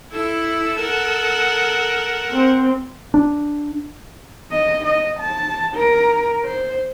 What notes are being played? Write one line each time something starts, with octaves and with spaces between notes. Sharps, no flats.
E4 A4 E6
A#4 F#5
C4
D4
D#5
D#5
A5
A#4
C5